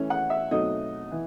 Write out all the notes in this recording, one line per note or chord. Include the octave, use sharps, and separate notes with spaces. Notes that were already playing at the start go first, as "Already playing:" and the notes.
Already playing: E3 A3 C#4
F#5
E5
B2 F#3 A3 C4 D#4 D#5
E3